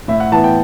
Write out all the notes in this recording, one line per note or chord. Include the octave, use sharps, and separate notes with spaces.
A2 E5
F#5
E3 B3 A5
G5